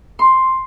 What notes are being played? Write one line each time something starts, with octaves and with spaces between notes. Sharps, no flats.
C6